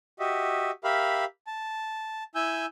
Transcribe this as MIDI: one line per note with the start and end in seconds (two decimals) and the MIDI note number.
0.19 0.71 66
0.19 0.71 67
0.19 0.71 75
0.19 0.71 76
0.84 1.25 67
0.84 1.25 70
0.84 1.25 76
0.84 1.25 77
0.84 1.25 83
1.47 2.24 81
2.35 2.66 64
2.35 2.66 80
2.35 2.66 88
2.35 2.66 91